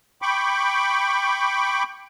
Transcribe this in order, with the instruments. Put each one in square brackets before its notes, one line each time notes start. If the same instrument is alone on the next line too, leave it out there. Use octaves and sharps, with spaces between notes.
[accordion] G5 B5 C#6 D6